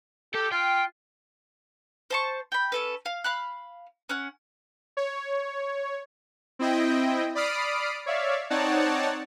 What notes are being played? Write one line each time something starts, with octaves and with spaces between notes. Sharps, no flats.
G4 A4
F4 G5
C5 A5 C#6
G5 B5
C#4 A4 B4
F5
F5 B5 F#6
C#4 F#5
C#5
C4 E4 D#5 G5
D5 B5 D#6 F6 C7 D7
C#5 D5 E5 F5
C4 D#4 C#5 D5 F#5 A5